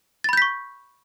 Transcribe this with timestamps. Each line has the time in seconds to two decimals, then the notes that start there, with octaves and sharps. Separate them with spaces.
0.24 A6
0.29 B5
0.33 G6
0.37 B6
0.42 C#6